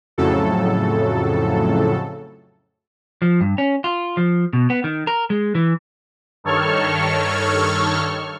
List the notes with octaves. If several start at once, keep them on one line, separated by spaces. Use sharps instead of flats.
F2 A2 C#3 F#3 A4
F3
G2
C#4
F4
F3
B2
B3
D#3
A#4
G#3
E3
G2 D#3 A4 C#5 C#6 F6